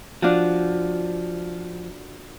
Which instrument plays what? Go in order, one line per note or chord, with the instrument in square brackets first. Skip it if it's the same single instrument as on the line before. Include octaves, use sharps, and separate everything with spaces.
[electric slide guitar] F3 [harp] D4 F4 F#4